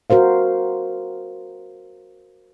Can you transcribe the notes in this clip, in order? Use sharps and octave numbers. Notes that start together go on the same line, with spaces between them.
F#4 A#4 C5 F5